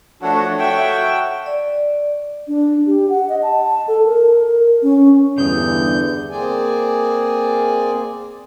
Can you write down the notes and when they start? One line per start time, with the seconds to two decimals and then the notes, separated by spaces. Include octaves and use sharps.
0.22 F3 A3 D4 F#4 A4 C#5 F#5
0.59 F#4 E5 G5
1.46 D5
2.48 D4
2.86 G4
3.09 F#5
3.29 D#5
3.42 A5
3.88 A4
4.05 A#4
4.48 A#4
4.82 C#4
5.38 E2 G2 D3 D#6 G6
6.30 A#3 C4 G#4 D5 G#5